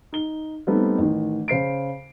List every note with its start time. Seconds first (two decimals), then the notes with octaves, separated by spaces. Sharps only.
0.12 D#4 G7
0.67 G3 A3 B3 C4 D#4
0.98 A1 D#3
1.48 C#3 C5 C7 D7